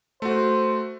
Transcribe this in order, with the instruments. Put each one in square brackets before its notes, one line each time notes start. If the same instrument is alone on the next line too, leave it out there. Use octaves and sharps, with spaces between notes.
[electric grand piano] A3 F#4 [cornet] C5